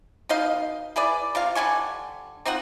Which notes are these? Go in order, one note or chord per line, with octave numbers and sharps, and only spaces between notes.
B2 D#4 D#5 F5
E4 G#4 B4 D5
C3 F4 F5
D3 G3 G#5 C#6
C4 D#4 F4 F#5